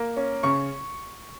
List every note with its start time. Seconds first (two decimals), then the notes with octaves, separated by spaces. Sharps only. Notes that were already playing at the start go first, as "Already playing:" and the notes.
Already playing: A#3
0.16 C#4
0.43 C#3 C#6